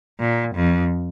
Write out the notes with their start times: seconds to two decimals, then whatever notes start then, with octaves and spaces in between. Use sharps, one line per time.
0.20 A#2
0.55 F2